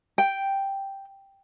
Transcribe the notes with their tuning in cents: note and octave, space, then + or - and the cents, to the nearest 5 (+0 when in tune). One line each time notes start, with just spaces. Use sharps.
G5 +0